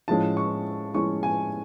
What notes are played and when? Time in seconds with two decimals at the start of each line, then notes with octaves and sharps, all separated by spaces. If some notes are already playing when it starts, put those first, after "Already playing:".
0.08 A2 F3 G#3 C#4 A5
0.37 C#6
0.94 A2 F3 G#3 C#4 C#6
1.23 G#5